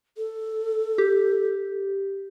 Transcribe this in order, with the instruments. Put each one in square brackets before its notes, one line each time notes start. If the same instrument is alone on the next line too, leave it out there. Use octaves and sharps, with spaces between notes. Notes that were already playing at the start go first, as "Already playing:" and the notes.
[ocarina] A4
[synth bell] G4